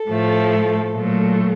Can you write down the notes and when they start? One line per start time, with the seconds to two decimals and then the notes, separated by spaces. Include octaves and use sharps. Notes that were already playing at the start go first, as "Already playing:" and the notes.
Already playing: A4
0.09 A2 F3 A3
0.94 A#2 F#3 A3